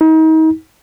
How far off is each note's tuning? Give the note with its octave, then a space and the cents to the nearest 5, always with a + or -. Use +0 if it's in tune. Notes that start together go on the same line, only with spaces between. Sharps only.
D#4 +35